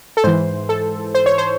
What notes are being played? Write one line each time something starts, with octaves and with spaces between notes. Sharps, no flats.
A4
G#2 E3 C5
A4
C5
C#5
C5